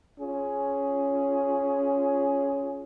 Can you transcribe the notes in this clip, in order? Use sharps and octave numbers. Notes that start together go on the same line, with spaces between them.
C#4 F4 G#4